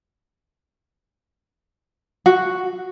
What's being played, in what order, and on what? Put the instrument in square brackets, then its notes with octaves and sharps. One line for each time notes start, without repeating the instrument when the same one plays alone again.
[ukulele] F#4